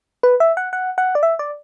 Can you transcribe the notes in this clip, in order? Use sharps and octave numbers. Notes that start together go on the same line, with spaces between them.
B4
E5
F#5
F#5
F#5
D5
E5
D5